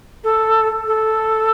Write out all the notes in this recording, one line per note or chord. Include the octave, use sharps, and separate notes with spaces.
A4
A4